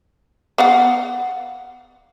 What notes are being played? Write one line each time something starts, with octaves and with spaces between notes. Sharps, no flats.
B3 F5 F#5